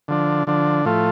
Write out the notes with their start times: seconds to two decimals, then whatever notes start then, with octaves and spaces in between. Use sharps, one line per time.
0.08 D3 F3 D4
0.47 D3 F3 D4
0.85 A2 F3 A3 F4